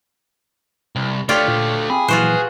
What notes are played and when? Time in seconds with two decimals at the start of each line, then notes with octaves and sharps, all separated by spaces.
0.96 C2
1.29 D3 A3 F4 G4 C#5 D5
1.48 A#2
1.90 C4 G#4 B5
2.08 A#2 E3 F#3 F4 F#4 B4 C5